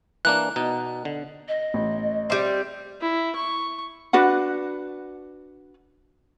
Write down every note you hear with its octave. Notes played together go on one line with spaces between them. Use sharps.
E3 A#3 D4 F#6
B2 D#4
D3
D#5
A1
G3 C4 E5 D6
E4
C#6
D4 F#4 B4 F#5